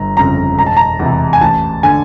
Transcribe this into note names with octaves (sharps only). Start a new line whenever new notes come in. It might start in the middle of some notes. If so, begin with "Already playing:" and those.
Already playing: G1 A#5
F2 C#3 A#5
E1 A#5
A5
A#5
E2 C3 E3
G#5
A1 A5
D3 G#5